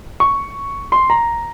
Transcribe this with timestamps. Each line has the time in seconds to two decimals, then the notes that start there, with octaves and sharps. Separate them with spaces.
0.20 C#6
0.92 C6
1.10 A#5